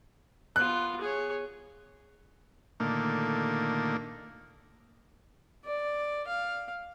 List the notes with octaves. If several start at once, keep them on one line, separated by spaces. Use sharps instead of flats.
B3 F4 F#6
G#4 C#5
A#2 D3 D#3 A3 A#3
D5
F5